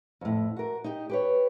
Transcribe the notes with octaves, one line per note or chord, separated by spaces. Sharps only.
F2 A2
F#4 A#4
D#4 G4
G4 B4 C#5